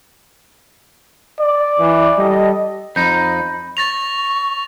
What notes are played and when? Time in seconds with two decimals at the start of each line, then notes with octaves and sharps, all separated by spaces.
1.41 D5
1.78 E3
2.17 G3 A4 D#5
2.96 F2 D#4 B5 G6
3.77 C#6 A6 A#6 F7